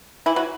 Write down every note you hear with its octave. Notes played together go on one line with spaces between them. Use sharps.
E3 E4
F#3 F#4